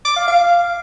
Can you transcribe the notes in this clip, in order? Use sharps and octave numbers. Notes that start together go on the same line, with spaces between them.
D6
F5
F5